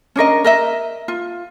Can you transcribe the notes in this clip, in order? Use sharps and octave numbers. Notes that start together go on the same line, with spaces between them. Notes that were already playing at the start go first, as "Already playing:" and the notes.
C#4 D4 A#4 D#5
A#4 D#5 E5
F4